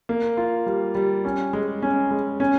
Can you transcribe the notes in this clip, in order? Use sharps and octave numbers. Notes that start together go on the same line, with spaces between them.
A#3
F4
G3
G3
C#4
G#3
C#4
G#3
C#4